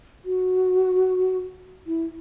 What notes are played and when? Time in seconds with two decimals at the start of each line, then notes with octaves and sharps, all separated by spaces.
0.25 F#4
1.87 E4